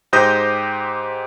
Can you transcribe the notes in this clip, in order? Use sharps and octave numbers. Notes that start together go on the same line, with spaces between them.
G#2 G4 C5 D#6 G6 A#6